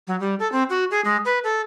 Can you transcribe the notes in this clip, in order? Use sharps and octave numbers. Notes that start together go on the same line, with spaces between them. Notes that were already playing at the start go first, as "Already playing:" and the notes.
F#3
G3
A4
C4
F#4
G#4
G#3
B4
A4